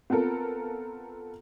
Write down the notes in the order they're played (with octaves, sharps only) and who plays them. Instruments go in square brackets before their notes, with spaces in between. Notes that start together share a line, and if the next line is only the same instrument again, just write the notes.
[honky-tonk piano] B3 C4 F4 A4 A#4